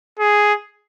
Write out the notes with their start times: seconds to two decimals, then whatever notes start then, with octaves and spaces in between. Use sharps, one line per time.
0.19 G#4